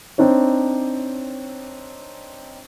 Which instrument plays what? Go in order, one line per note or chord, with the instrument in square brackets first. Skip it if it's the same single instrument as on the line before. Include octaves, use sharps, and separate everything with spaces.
[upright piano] C4 D4 D#4 C#5